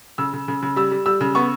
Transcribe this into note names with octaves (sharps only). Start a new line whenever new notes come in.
C#3 E6
C#3
C#3
C#3
G3 E6
G3
G3 E6
C#3
B3 C#6